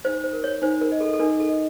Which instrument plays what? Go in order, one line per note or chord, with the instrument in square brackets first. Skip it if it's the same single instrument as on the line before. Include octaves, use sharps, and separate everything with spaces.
[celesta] D#4 [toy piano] C5
[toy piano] C5
[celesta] A#4
[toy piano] C#5
[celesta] D#4 [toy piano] C5
[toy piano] A#4
[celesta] D#5
[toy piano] A4
A4
[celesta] D#4 [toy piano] A#4
[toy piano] A4
[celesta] D#5